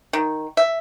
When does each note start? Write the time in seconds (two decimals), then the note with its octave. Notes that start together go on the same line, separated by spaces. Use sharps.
0.13 D#3
0.57 E5